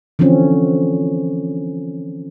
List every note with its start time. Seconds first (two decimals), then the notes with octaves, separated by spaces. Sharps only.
0.19 D3 E3 F3 C4 C#4